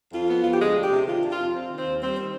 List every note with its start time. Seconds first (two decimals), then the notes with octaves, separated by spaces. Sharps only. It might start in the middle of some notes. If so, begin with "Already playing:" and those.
0.12 F2 F4
0.27 B3
0.42 F2 F4
0.51 G4
0.59 D2 G#3 G#4
0.75 D4
0.82 G4
0.91 C3
1.06 D#3 F4
1.21 D4
1.30 F4
1.38 F2
1.53 C4
1.68 D#3
1.77 C4 C5
1.85 D#2
2.00 G3 C4 C5
2.15 D#3 C5